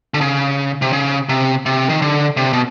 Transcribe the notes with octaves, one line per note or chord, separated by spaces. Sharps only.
D3
C#3
C3
C#3
C3
C3
D#3
D3
C3
B2